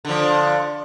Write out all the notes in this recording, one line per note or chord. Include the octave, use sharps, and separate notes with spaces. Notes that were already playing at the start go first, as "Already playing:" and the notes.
D3 F3